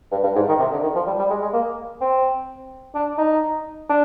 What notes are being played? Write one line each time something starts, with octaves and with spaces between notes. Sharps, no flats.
G2
G2
G#2
D#3
C3
D3
D#3
F3
G3
G3
G#3
G#3
A#3
C4
D4
D#4
D4